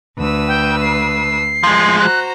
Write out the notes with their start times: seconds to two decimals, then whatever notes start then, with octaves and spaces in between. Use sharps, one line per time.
0.18 D2 B4 E6
0.48 G5
0.82 C7
1.63 F3 G#3
1.99 F#4 C5 A#5 F#6